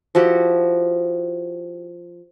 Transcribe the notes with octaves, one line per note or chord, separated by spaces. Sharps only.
F3 E4 F#4 G4